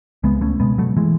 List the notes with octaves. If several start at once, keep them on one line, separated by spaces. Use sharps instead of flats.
C#2 G#3 B3
A3 C#4
B2 G#3 B3
F#3 A3
E3 G#3